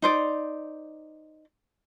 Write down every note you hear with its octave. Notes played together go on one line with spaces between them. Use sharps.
D#4 C5 D5